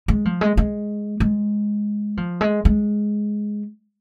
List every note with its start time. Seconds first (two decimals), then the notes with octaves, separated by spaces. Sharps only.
0.08 G#3
0.25 F3
0.41 G#3
0.57 G#3
1.20 G#3
2.17 F3
2.41 G#3
2.65 G#3